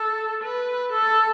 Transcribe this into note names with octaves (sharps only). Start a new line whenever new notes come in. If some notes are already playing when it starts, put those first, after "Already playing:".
Already playing: A4
B4
A4